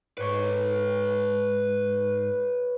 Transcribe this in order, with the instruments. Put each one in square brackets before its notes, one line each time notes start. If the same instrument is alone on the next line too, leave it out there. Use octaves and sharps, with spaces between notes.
[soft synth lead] G#2 [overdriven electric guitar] B4 C#5